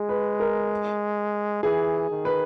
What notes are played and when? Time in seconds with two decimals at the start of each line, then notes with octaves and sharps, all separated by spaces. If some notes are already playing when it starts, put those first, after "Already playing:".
Already playing: G#3 G#4
0.09 B4
0.40 A#4
1.63 E3 G#4
2.10 D#3
2.25 B4